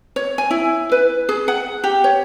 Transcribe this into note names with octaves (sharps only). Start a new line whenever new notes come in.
C#5
G#5
E4
B4
G#4
F#5
G4
C#5